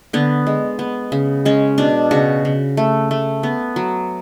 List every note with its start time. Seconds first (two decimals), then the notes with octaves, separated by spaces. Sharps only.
0.13 D3 B3
0.47 G#3
0.79 B3
1.12 C#3
1.45 G#3 C#4
1.78 B2 D4
2.11 C#3 F#4
2.45 C#3
2.77 A3
3.11 A3
3.43 B3
3.76 F#3